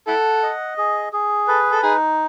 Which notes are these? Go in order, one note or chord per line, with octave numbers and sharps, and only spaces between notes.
E4 A4 F#5
D#5
G#4
G#4
A4 B4
A4
D#4 G#4